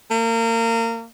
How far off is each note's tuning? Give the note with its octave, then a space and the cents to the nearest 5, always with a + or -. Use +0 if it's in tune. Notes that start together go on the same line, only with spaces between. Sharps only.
A#3 -30